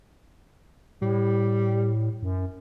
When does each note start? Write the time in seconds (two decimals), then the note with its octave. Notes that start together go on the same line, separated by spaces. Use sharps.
1.02 A2 G3
2.23 F#2